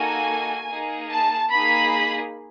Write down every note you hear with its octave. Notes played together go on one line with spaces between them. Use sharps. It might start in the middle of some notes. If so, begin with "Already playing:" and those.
Already playing: A#3 D#4 F#4 A4 G#5
A#3 D#4 G#4
A5
A#3 D#4 G#4 B5